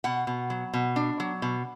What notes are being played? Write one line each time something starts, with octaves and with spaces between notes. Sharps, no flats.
B2 F#5
B2
F#3
B2
D4
F#3
B2